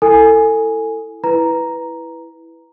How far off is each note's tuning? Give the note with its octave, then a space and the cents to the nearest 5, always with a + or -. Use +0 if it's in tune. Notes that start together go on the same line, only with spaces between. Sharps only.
E4 +0 A4 +20 G#5 +0
E4 +0 B4 +0 A#5 +0